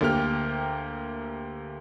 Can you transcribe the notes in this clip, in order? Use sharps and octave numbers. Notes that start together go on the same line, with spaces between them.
D2 A#3 G4 G5 F6